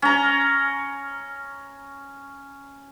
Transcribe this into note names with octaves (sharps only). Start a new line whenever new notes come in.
C#4 A#5